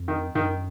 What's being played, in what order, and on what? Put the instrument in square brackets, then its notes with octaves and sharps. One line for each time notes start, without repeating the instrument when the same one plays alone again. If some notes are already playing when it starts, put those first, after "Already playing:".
Already playing: [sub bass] F2
[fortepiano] D#3
[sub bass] F#2 [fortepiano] D#3